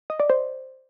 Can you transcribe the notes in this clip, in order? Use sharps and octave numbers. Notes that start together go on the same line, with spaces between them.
D#5
D5
C5